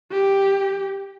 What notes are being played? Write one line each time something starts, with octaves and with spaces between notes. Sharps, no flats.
G4